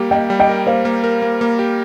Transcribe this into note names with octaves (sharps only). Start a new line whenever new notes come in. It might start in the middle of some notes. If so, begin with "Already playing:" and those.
Already playing: G3 A#3 G4
A#3 D#5 G5
G3
D#5 G5
A#4
A#3 C5 F5
A#3
A#4
A#3
A#3
G4